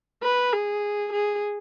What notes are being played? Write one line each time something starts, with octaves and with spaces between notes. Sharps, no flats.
B4
G#4
G#4